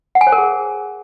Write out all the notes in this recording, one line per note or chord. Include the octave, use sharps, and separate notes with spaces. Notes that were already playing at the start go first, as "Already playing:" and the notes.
F#5
G#5
C5
A#4
G#4